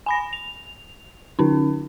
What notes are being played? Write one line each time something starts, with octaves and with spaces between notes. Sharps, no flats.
G#5 B5 A#6
F7
D3 C#4 D#4